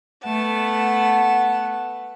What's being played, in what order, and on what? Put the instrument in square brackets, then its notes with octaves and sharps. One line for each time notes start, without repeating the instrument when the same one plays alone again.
[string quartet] A3 B3 A5 [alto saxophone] F#5